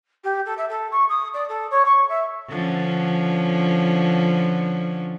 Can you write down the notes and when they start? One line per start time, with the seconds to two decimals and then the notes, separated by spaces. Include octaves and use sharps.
0.24 G4
0.46 A4
0.57 E5
0.69 A4
0.92 C#6
1.09 D#6
1.34 D5
1.49 A4
1.71 C#5
1.85 C#6
2.09 E5
2.49 D3 F3 C#4